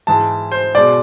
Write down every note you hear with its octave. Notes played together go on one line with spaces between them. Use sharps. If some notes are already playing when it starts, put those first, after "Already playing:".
G#2 E3 G#3 A5
C5
B2 G#3 D5